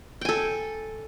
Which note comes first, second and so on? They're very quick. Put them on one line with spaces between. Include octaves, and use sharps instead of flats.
G5 G#5 A4